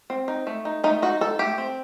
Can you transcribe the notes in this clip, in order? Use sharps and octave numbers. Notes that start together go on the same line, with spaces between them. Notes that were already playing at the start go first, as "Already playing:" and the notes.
C4
D#4
A3
D#4
A3 D#4
D#4 F#4
D#4 A4
A3 G4
C4